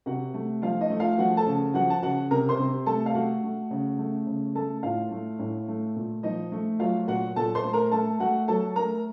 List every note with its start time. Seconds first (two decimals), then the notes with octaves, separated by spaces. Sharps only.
0.06 C3 F#4 F#5
0.34 A3
0.62 F3 F4 F5
0.81 D#4 D#5
0.90 A3
1.00 F4 F5
1.18 F3 F#4 F#5
1.37 A4 A5
1.46 C#3
1.74 F3 F#4 F#5
1.90 A5
2.02 C#3 F#4 F#5
2.31 C3 A#4 A#5
2.49 C5 C6
2.59 C3
2.86 A3 A4 A5
3.06 F5
3.15 A3 F#4 F#5
3.44 A3
3.71 C#3
3.99 A3
4.27 C#3
4.55 A3 A4 A5
4.83 A2 F4 F5
5.11 A3
5.39 A2
5.68 A3
5.96 A#2
6.23 F3 D#4 D#5
6.52 A3
6.80 F#3 F4 F5
7.08 A#2 F#4 F#5
7.36 A#2 A4 A5
7.55 C5 C6
7.64 A3
7.73 A#4 A#5
7.91 A3 A4 A5
8.20 A3 F#4 F#5
8.48 F#3 A4 A5
8.76 A3 A#4 A#5